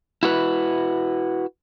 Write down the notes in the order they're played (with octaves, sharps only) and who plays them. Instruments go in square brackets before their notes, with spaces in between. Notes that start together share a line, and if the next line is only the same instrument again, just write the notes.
[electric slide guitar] E4 F#4 B4